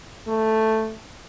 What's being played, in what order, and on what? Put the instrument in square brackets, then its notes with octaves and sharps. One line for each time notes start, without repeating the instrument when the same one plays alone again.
[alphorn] A3